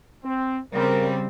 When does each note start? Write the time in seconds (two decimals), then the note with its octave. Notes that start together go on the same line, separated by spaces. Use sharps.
0.25 C4
0.73 C#3 G3 C4 A#4